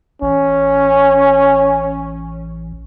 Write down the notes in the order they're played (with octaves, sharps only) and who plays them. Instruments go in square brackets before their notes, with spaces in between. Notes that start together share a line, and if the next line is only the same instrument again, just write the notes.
[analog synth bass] A1 [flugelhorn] C#4